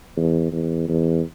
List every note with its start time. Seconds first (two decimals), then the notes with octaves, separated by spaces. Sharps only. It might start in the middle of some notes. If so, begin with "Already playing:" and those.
0.17 E2
0.52 E2
0.88 E2